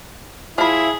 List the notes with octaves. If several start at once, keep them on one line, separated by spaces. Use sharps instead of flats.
F3 E4 G#4 E5 B5